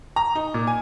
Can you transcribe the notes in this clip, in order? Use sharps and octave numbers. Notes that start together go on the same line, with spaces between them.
A#5
D#4
A#2
G#5